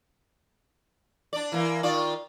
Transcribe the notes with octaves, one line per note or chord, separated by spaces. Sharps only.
D4 D5
E3 A#3
D#3 F4 D5